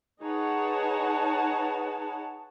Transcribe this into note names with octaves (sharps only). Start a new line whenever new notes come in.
D#4 G#4 B4 C#5 F#5 A5